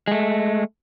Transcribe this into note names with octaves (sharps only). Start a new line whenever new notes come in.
G#3 A3